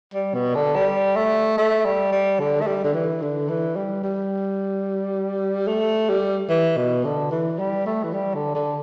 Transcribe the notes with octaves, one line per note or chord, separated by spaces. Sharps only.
G3
B2
D3
G3
A3
A3
G3
G3
D3
A3
G3
D3
E3
D3
E3
G3
G3
A3
G3
E3
B2
D3
E3
G3
A3
E3
G3
D3
D3